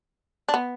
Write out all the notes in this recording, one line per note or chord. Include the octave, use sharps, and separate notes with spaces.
D4
B3